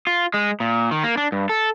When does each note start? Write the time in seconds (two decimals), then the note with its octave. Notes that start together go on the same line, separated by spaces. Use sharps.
0.07 F4
0.34 G#3
0.60 A#2
0.91 D#3
1.04 A#3
1.17 D4
1.32 G2
1.49 A4